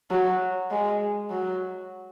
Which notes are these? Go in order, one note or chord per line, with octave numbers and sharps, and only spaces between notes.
F#3
G#3
F#3